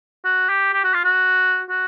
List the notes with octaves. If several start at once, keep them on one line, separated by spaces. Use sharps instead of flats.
F#4
G4
G4
F#4
F4
F#4
F#4